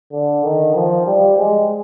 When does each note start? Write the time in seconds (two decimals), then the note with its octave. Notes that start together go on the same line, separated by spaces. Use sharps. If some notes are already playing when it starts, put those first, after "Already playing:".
0.12 D3
0.44 D#3
0.75 F3
1.07 G3
1.38 G#3